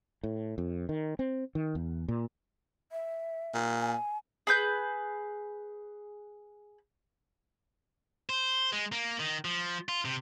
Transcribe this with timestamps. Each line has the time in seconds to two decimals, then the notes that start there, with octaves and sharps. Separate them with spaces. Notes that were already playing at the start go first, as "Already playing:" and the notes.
0.23 A2
0.58 F2
0.89 D#3
1.19 C4
1.55 D#3
1.75 E2
2.08 A#2
2.92 E5
3.54 A#2
3.79 G#5
4.47 G#4 B4 G6
8.29 C5
8.72 G#3
8.92 A#3
9.20 D#3
9.45 F3
9.89 F4
10.05 C3